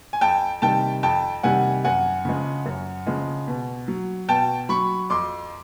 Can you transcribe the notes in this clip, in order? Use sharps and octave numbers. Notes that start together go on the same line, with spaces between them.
G#5
F2 G5 A5
C3 D#3 G3 G5 A5
F2 G5 A5
C3 D#3 G3 F#5 G#5
F#2 F#5 G#5
C#3 F3 G#3
F#2
C#3 F3 G#3
B2
F#3
B2 G5 A5
F#3 B5 C#6
F2 C6 D6